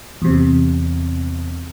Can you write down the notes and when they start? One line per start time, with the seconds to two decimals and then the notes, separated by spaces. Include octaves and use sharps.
0.22 E2 C3